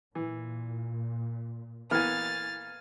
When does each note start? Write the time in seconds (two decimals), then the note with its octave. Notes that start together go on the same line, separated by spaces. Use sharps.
0.15 A#2 E3
1.91 E3 A#3 B3 F5 G#5 F6 A6